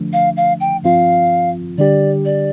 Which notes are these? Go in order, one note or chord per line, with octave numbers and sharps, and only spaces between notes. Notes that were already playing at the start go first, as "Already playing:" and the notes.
Already playing: D3 F3 A3 D4
F5
F5
G5
G2 F3 C4 F4 F5
D3 G3 D4 G4 D5
D5